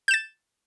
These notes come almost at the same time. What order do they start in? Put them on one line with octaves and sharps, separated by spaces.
G6 E7 A6